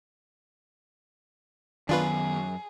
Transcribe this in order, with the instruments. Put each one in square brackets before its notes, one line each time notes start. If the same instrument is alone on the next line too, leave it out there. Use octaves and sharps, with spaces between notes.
[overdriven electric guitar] F#2 [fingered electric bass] D#3 B3 [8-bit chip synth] D4 F4 B4 [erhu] G#4